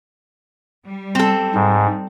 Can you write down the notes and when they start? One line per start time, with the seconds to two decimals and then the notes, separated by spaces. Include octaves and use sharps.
0.86 G3
1.15 C4 A4
1.54 G#2